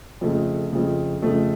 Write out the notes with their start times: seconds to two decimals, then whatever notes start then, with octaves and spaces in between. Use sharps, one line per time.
0.21 F2 C#3 A3
0.72 F2 C#3
1.22 F2 C#3 A3